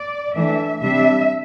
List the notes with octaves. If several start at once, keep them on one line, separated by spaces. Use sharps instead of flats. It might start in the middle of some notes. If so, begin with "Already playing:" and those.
Already playing: D5
E3 A3 D4 E5
C3 G3 D4 E5